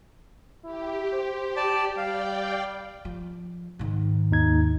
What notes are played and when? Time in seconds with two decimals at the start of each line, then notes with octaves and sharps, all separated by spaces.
0.65 E4 G4
1.13 C5
1.57 D5 A5
1.97 G3 D5 F5 G5
3.05 F3
3.79 G#2 D#3
4.31 D#2 D#4 G#6